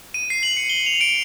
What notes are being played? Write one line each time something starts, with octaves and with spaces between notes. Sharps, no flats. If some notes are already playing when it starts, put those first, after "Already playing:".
D#7
C7
F#7
C#7
G7
F7
D7